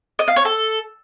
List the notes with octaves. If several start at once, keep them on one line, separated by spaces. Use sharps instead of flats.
D#5
F5
C#5
A4